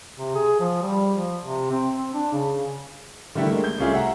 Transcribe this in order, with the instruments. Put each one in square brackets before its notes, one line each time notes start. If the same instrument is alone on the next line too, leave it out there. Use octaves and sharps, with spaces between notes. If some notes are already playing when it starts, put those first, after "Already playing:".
[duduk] C3
G#4
F3
G3
F3
C3
C4
C4
D4
C#3
[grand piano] D3 D#3 G3 A3 D4 E4
G#3 A#3
G6
C2 A3 C#4 F4 G#4 E5
E5 F#5 A#5